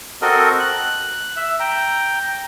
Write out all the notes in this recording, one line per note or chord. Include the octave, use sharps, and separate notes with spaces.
C4 F#4 A4 A#4 D#5
F#6
E5
G5 A#5